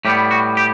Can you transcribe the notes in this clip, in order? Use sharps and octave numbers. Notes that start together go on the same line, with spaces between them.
A2 G3 B3 G4
F#4
G4